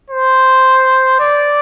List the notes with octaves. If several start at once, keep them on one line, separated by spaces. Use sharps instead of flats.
C5
D5